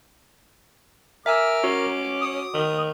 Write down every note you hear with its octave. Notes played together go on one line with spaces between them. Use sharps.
A#4 E5 G#5 D6 E6 F6
C#4 F#4
D#6
D#3